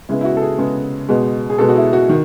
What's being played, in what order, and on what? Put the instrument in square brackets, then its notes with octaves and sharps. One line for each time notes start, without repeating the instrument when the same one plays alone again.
[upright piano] C#3 G#3 B3 E4
E4
F#4
A4
G#4
C#3 G#3 B3
B2 G#3 B3
G#4
B2 G#3 B3 A4
F#4
E4
F#4
D#3